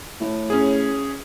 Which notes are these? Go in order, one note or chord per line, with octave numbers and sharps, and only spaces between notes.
A2
C#4 G#4